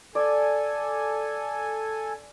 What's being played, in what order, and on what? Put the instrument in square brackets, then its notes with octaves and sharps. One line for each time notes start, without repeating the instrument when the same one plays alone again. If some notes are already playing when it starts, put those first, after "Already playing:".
[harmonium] A4 G#5 [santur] D5